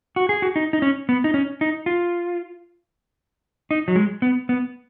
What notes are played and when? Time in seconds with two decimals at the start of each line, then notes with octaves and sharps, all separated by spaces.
0.16 F#4
0.29 G#4
0.42 F#4
0.56 D#4
0.73 D#4
0.82 C#4
1.09 B3
1.24 D#4
1.34 C#4
1.61 D#4
1.86 F4
3.71 D#4
3.88 F#3
3.96 G#3
4.22 B3
4.49 B3